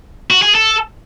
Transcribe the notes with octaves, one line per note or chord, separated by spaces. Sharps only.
F#4
G#4
A4